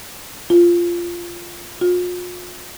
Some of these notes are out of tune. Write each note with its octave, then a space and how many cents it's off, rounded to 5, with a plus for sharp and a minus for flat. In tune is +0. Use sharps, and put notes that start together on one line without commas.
F4 -10
F4 +40